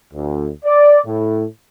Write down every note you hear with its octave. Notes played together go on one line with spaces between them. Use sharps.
D2
D5
A2